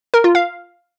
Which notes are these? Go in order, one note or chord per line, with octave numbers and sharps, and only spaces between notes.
A#4
F4
F5